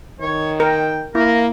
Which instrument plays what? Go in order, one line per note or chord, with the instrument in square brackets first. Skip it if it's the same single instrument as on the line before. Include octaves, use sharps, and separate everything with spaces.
[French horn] D#3 [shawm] C#5
[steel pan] A#4 [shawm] G5
[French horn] A#3 [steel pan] E4 [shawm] A#4